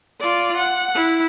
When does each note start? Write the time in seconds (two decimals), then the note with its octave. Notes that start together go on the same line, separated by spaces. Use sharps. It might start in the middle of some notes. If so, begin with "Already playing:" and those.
0.20 F4 D5
0.57 F#5
0.95 E4